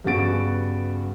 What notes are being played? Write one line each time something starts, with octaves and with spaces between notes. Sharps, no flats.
G2 C#3 B3 F#4 A6 D7